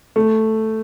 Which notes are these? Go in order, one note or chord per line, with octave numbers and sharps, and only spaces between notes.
A3